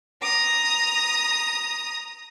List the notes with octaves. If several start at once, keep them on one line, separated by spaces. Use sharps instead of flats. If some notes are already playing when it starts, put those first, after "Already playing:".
A#5 D#6